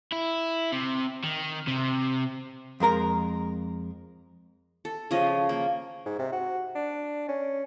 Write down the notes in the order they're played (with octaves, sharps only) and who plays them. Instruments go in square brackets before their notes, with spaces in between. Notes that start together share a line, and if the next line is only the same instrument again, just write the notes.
[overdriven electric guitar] E4
C3
D#3
C3
[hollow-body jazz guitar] F2 G#3 A#4 A#5
[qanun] A4
C#3 F3 C#4 D#5
A#3
[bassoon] G#2
C3
F#4
D4
C#4